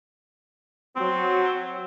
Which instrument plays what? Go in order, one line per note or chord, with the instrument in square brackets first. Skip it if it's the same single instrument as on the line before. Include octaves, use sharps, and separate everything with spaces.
[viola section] F#3 [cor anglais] C4